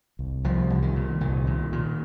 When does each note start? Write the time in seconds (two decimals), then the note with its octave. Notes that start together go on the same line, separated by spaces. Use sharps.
0.19 C2
0.44 C2 F3
0.70 C2
0.82 D#3
0.96 A#2
1.21 C2 D#3
1.47 A#2
1.72 A#2